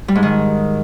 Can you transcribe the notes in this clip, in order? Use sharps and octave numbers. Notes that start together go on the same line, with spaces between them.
G3
G#2
D#3